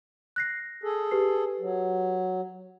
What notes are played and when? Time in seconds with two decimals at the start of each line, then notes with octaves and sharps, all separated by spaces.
0.36 F#6 A#6 C7
0.84 G#4 A4
1.11 G4 B4 C7
1.60 F#3